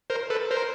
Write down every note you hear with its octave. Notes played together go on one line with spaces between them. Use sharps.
A#4 C5
A4 B4
A#4 C5